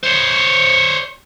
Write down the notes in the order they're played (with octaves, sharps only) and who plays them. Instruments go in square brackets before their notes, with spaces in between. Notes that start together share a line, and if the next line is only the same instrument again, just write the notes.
[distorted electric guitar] C5 C#5